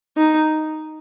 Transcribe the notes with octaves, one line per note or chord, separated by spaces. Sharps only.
D#4